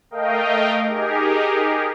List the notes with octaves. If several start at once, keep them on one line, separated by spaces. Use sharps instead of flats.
A3 A#4 D#5 F5 G5
D#4 G4 G#4 A#4